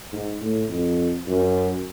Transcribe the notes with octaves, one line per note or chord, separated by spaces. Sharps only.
G#2
A2
F2
F#2